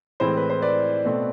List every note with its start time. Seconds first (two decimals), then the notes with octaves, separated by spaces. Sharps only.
0.20 A2 E3 G#3 C4 C5
0.37 B4
0.50 C5
0.62 B4 D5
1.05 B2 A3 C4